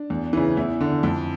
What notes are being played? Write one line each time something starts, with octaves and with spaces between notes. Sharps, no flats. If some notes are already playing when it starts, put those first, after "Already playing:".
Already playing: D4
E2
C#3 E3
E2 E4
D3
F2